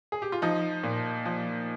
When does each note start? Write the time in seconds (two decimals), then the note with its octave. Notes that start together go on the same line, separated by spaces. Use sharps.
0.12 G#4
0.22 G4
0.32 F4
0.42 F3 D#4
0.83 A#2
1.25 F3